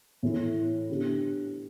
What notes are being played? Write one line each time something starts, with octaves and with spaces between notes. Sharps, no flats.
A2 E3 A3 E4
D3 B3 G4